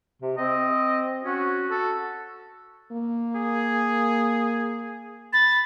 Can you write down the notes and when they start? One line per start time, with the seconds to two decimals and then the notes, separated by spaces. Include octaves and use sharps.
0.22 C3
0.38 C4 D#5
1.24 C#4 F#4
1.70 A4
2.92 A#3
3.36 G#4
5.33 B5 A6